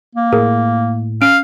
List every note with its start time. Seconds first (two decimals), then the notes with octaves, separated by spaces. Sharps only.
0.15 A#3
0.33 A2 G#4 A#4
1.22 C#4 F5 D7